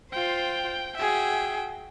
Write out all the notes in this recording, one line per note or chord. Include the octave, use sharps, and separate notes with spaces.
F4 C5 G5
F#4 G#4 E5 G5